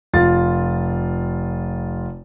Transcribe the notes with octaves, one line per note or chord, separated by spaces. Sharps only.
F1 F4 A6